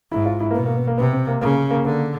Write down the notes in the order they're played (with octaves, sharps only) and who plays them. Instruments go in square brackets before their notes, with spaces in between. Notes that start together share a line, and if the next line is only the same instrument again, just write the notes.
[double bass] G#2 [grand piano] E4
[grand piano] F4
E4
A#3
[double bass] B2 [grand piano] B3
[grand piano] A#3
B3
A#3
[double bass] C3 [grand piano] B3
[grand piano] C4
A#3
[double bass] C#3 [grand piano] A#3
[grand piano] A#3
[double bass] D3 [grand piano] A#3